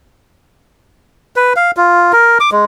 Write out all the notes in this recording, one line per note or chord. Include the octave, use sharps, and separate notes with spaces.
B4
F5
F4
A#4
D6
G#3